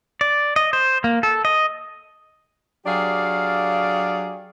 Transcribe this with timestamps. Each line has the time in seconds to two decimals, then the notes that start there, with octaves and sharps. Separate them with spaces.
0.21 D5
0.56 D#5
0.73 C5
1.04 A#3
1.23 A4
1.45 D#5
2.86 F#3 D4 G4 G#4 D5 F5